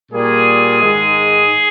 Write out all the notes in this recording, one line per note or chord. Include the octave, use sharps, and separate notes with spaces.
A#2 G3 A#3 G#4
G#2 D#3 G#3